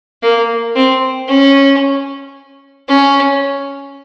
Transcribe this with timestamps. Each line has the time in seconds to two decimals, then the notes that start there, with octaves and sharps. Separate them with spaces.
0.23 A#3
0.76 C4
1.28 C#4
2.88 C#4